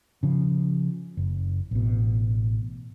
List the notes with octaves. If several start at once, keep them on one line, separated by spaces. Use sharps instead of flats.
C#3 F3
F#1
A1 B2